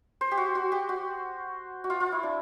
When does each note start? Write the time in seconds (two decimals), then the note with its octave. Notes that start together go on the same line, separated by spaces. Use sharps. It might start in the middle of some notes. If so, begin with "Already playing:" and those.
0.21 C5
0.31 G4
0.37 F#4
0.55 F#4
0.72 G4
0.89 F#4
1.84 F#4
1.90 F4
2.00 F4
2.12 E4
2.23 D4